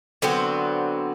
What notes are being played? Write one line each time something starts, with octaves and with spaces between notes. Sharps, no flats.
D3 F#3 B3 C4